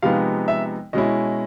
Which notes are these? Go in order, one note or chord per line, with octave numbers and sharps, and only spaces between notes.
C3 F3 G#3 B3 D#4 F5
E5
B2 G#3 C#4 E4 D#5